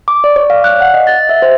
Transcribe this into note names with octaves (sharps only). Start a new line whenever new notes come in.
D6
D5
C#5
F5
F#6
F#5
D#5
A6
E5
C5